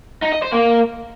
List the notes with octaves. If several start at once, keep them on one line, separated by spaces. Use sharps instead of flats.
D#4
D#5
C5
A#3